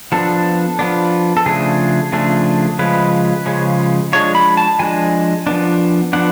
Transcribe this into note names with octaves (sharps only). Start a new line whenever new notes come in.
F3 B3 D4 A4
F3 B3 D4
A4
C#3 F3 A3 D4 G#4
C#3 F3 A3 D4
C#3 F3 G#3 C#4 B4
C#3 F3 G#3 C#4
F3 G#3 D4 C#5
B5
A5
F3 G#3 D4 G#5
F3 B3 D4
F3 B3 D4 F#5